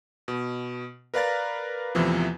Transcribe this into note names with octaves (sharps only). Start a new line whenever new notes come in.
B2
A#4 B4 D5 F5 A#5 A6
E2 A2 C3 E3 F3